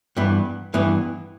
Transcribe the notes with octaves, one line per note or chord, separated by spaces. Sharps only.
G2 E3 B3
G2 E3 B3